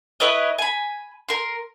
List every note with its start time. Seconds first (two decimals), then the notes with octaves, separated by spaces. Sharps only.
0.20 E4 B4 C#5 D#5
0.58 G#5 B5
1.29 A#4 C6